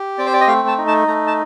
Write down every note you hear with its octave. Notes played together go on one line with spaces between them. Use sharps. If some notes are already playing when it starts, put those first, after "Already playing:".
Already playing: G4
C4 D5
C5
D5
D#5
A3 F5
A5
D#4
A5
A3 A#5
A5